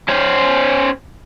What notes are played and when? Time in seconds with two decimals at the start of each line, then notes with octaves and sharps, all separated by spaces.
0.09 C#4 C5